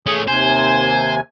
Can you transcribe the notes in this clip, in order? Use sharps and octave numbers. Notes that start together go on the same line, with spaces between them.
A3 C#4 G#4
D#2 C3 C5 G#5